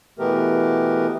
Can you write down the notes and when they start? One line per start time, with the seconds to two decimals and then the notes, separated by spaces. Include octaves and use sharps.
0.19 B2 E3 A3 B3 G4 A#4